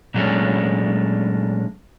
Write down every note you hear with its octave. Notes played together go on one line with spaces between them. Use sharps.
A#2 F#3 G#3 A3 C#4 D4